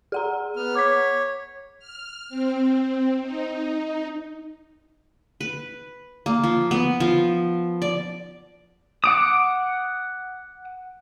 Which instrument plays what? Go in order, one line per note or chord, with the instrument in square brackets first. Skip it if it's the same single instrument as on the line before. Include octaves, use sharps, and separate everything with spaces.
[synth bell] G#4 F#5 A#5
[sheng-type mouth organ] B3 F6
[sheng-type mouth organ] C#5 [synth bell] D6 B6
[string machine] F6
C4
D#4
[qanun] B4
A#3
F3
B3
F3
D5
[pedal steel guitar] F#5 D6 D#6